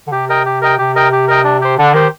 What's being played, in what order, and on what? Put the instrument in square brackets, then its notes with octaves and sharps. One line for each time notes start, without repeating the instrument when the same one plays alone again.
[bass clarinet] D3
[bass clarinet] C3 [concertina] G4
[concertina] A#4 D#5 G5
G4
A#4 D#5 G5
[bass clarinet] C3 [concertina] G4
[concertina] A#4 D#5 G5
G4
A#4 D#5 G5
D4
G4 C5
[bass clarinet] D3 [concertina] D4
[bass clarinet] D#3 [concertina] G4 C5